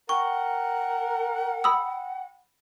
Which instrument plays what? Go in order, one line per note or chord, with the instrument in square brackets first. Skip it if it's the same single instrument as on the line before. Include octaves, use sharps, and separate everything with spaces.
[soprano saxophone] A#4 [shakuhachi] F#5 [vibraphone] G5 [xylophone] C#6
[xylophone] B5 D#6 E6